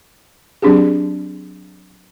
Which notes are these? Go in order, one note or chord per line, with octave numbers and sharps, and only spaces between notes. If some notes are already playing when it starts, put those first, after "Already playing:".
F#3 C4 D4 G4 G#4